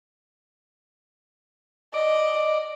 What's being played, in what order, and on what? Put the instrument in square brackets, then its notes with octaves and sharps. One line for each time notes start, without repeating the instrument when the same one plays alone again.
[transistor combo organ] D5 [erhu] D#5